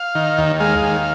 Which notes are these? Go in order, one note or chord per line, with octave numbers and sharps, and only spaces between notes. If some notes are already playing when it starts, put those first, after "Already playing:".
Already playing: F5
D#3
D#2
G#3 F5
D#2